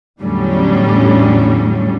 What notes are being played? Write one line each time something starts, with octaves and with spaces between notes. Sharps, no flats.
E2 A2 D3 F#3 G3 C#4